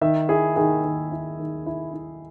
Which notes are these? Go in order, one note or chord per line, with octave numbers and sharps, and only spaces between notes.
D#3 E5
E4 G#4
D#3 G#4
D#3
E4
D#3
E4
E4